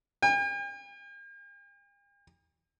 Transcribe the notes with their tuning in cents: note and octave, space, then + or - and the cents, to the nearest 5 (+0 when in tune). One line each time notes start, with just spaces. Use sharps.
G5 +45